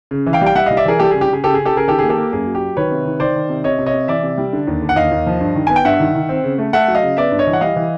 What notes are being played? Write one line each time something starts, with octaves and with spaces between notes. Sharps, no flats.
C#3
E3
F5 G5
G3
G5
G3 E5 F#5
G3 D#5 F5
D5 E5
E3 G#4 A#4
G3 G4 A4
C#3 G#4
G4
C#3 G#4
C#3 G4 A4
C#3 G#4
G4 A4
C#3 G#4 A#4
D#3 G4 A4
A#3 G#4
G4 A4
A#3
F#2 G#4
F#3
G4
F#3
D#3 B4 C#5
C3
D#3
D#3 C5 D5
D#3
C3
C3 C#5 D#5
C3
C#5 D#5
C3
E3 D5 E5
C3
G3
D3
D#2
D3
F#5
D#2 D#5 F5
D#2
F3
G2
D#3
B3 G#5
G5
G2 E5 F#5
D#3
D#3
C4
C#3
A3
A3 E5 F#5
F#3
D#5 F5
C#3
B3 D5 E5
G2
C#5 D#5
E3
F#5
G3 D#5 F5
E3